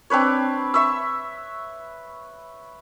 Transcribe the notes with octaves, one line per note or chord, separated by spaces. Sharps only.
C4 D4 B4 C#5
E5 C#6 E6